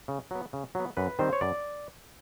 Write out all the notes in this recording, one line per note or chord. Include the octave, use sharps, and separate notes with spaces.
C#3
F#3 B3
C#3
F#3 B3
F#2 B4
D#3 G3 C4 C5
C#5
F#2 D5